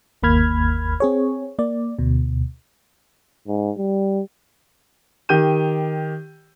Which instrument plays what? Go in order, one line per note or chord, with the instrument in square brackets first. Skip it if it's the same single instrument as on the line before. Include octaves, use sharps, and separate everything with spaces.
[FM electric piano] G1 D#2 A#3 B5 F6 G#6
C4 G#4 C#5
A#3 D5
D2 B2
[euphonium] G#2
G3
[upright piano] D#3 G4 G6 D#7